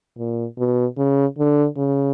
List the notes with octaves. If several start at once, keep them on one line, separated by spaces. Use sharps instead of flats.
A#2
B2
C#3
D3
C#3